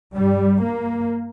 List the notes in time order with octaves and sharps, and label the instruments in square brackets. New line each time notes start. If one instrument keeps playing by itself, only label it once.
[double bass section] G2 G3
A#3